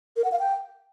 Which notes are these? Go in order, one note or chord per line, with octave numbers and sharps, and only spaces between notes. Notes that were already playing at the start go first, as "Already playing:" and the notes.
A#4
F#5
F5
G5